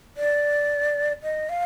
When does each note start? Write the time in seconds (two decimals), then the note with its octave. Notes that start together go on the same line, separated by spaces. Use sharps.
0.17 D5
1.23 D#5
1.49 F5